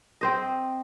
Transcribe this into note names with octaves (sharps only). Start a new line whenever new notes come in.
C4 C5 D#5